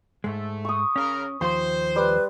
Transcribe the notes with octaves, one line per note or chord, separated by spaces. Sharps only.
G#2 G#3 A3
C#6 D#6
C#3 C#4 A#4
D#2 F3 C5 C6
G3 B4